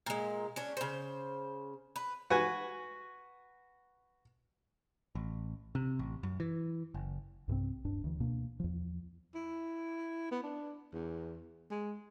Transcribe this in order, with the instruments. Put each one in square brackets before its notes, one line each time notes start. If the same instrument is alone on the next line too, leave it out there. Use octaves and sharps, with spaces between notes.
[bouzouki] A#2 G#3
C#4 D4
C#3 C5
B4
[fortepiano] F#4 B4 G#5
[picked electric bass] A1
C3
A1
F#2
E3
F#1
[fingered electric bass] B1 G2 C3 C4
D1 G2 D4
D2 E3
C#2 B2 A#3 D4
E2 F3
[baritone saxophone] E4
B3
D4
E2
G#3